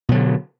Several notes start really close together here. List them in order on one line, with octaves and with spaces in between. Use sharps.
B2 F#3 D3